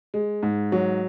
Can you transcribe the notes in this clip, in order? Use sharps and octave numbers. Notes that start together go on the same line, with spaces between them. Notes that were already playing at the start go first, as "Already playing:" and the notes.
G#3
G#2
F#3